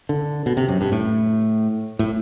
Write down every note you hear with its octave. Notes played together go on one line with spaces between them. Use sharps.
D3
B2
C3
F#2
G2
A2
A2